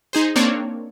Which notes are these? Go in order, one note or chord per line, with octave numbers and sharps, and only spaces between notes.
D#4 G#4 C5
A#3 C4 D4 C#5 D5